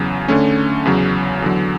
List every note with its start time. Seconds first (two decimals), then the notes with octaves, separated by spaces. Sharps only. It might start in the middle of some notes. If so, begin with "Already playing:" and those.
Already playing: E2 C#3 F#3
0.28 D3 A3 C#4
0.85 E2 C#3 F#3
1.42 E2 D3 F#3